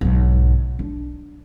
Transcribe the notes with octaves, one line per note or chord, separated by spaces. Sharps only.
B1 G#2
D4